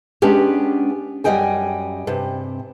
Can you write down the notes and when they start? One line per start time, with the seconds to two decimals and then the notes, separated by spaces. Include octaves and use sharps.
0.22 G#3 B3 C#4 D4 G4
1.24 F#2 G3 A3 D#5 G5 G#5
2.07 G2 C3